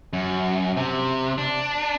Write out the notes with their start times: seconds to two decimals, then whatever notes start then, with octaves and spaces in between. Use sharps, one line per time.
0.13 F#2
0.77 C3
1.38 D4